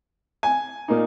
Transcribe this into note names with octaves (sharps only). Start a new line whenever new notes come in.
G#5
A#2 A#3 D#4